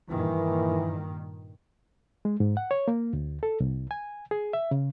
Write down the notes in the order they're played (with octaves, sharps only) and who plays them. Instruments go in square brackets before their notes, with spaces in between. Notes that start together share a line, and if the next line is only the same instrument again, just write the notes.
[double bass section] G2 A#2 D#3 [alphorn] E3
[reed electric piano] G#3
G#2
F#5
C#5
A#3
D2
A4
C2
G#5
G#4
E5
C#3